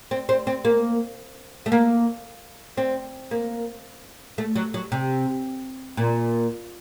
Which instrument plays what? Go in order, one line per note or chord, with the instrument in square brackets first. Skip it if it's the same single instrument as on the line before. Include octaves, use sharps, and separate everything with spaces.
[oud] C4
C4
C4
A#3
A3
A#3
C4
A#3
A3
F#3
F#3
C3
A#2